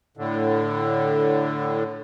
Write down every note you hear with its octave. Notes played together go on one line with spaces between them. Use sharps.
A2 D3